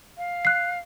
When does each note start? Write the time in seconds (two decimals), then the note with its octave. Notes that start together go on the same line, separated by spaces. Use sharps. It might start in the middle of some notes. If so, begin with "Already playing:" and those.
0.18 F5
0.45 F#6 C7